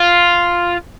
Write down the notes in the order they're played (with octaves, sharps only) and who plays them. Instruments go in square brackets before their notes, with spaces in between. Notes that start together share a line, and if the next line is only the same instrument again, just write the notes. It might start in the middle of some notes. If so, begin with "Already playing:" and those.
Already playing: [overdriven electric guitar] F4